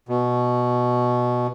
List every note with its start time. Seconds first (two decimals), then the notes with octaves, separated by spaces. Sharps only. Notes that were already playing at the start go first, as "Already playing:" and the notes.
0.09 B2